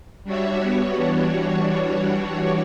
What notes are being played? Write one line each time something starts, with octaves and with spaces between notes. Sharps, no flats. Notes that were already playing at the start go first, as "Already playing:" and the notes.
G3 D4 F#4 C#5 E5
G3 B3 F#4 C#5
E3 G3 D4 F#4 C#5